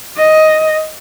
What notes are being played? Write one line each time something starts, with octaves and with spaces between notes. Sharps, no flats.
D#5